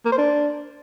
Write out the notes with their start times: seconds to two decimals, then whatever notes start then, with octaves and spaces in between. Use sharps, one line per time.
0.05 A#3
0.12 C5
0.18 D4